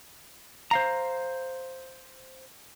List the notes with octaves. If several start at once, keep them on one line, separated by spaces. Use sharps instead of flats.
C5 F5 A#5